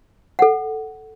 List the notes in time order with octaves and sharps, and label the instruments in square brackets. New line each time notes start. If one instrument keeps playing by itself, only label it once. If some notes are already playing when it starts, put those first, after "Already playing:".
[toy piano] A4 F#5